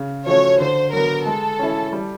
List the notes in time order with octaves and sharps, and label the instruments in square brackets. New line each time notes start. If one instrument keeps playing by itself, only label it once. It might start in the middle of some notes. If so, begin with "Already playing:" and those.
Already playing: [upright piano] C#3
[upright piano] F3 A3 C#4 F#4 [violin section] C#5
[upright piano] D3 [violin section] C5
[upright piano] F#3 B3 [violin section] A#4
[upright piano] G#3 [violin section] A4
[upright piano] C#4 E4
G3